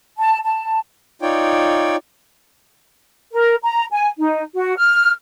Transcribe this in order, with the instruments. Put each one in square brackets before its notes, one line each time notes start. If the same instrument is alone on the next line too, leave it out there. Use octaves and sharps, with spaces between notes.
[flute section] A5
A5
[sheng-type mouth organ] D#4 F4 C#5 D5 G5
[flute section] A#4
A#5
G#5
D#4
F#4
F6